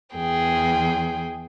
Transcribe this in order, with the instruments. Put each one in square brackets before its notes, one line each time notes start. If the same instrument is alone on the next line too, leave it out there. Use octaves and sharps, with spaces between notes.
[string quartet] E2 G#4 G5